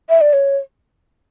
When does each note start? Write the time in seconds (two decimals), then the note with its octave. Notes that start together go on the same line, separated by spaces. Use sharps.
0.09 E5
0.21 D5
0.33 C#5